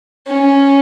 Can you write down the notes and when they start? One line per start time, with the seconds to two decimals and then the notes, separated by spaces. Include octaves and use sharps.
0.28 C#4